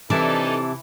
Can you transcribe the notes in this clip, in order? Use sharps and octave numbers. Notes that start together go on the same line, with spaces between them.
C3 E3 D4 D#4 A4 A5 D6